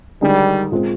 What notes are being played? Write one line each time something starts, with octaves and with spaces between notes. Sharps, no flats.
D3 D#3 G3 G#3 D#4 G#4
A#2 G#3 C4